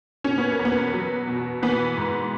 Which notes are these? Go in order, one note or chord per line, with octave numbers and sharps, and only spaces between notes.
B2 C#4
B3
A#3
E2
B3
F#3
B2
E3 B3
G#2